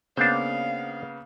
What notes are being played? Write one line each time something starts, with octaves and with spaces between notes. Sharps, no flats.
C#3 A#3 B3 D4 C5 F5